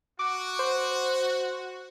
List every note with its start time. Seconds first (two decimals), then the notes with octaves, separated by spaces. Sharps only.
0.19 F#4 D6
0.59 C5